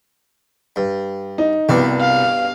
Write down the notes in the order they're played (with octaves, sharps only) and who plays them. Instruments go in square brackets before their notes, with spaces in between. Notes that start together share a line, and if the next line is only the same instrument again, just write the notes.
[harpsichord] G2
[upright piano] D#4
[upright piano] C2 [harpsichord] G2 B2 D4
[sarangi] F5